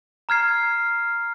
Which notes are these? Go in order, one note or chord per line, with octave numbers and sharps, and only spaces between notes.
A#5 F6 G#6 C7